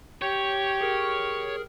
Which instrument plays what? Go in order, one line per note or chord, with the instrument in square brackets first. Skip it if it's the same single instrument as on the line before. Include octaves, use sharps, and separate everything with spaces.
[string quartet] G4 [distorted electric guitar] C#5 [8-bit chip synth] G6
[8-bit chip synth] G#4 A#4 F6